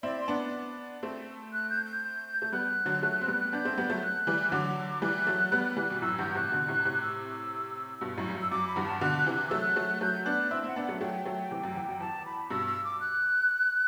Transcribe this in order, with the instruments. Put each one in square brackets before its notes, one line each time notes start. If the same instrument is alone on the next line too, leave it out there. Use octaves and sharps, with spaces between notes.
[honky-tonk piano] C4 E4 [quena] D5
[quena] C6
[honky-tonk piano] B3 D4
A3 C4
[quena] F#6
G6
G6
[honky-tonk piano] A3
[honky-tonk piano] G3 B3 [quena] F#6
[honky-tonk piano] D3 F#3
F#3 A3
C4
G3 B3
[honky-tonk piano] B3 D4 [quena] G6
[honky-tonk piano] A3 C4
G3 B3
F#3 A3
[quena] F#6
[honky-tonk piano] E3 G3
[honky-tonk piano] D3 F#3 [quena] D6
[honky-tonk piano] E3 G3 [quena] F#6
[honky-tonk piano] F#3 A3
G3 B3
E3 G3
B2
[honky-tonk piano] F#2 A2 [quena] E6
[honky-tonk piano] E2 G2 [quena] G6
[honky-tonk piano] A2 C3 [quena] F#6
[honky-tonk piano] B2 D3
A2 C3
A2 C3
[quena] E6
[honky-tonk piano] G2 B2
F#2 A2
G2
F#2
[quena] E6
[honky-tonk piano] F#2 [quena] D6
[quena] B5
[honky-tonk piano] E2 G2
[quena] A5
[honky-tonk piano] B2 D3 [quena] F#6
[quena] F#6
[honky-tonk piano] C3 E3
[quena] F#6
[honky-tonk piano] F#3 A3 [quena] E6
[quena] F#6
[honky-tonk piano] F#3 A3
[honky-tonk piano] F#3 A3 [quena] G6
[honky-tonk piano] B3 D4 [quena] F#6
[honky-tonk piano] C4 E4 [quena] E6
[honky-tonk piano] C4 E4 [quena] F#5
[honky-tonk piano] B3 D4
[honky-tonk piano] F#3 A3 [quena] F#5
[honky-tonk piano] F#3 A3 [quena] G5
[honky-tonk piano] F#3 A3
C3 E3
F#2
E2
F#2
[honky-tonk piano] E2 [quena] A5
[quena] B5
[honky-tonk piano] G2 B2 [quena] E6
[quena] E6
D6
F#6